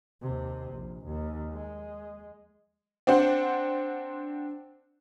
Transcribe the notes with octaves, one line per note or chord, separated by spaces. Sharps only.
D#2 C3
A#1
D#2
G#3
C4 D4 C5 F#5